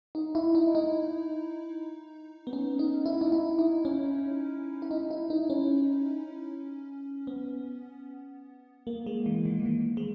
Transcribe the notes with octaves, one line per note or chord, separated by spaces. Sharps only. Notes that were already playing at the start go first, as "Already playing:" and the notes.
D#4
E4
D#4
D#4
B3
C#4
D#4
E4
D#4
E4
D#4
C#4
E4
D#4
E4
D#4
C#4
B3
A#3
G#3
E3
D#3
E3
D#3
G#3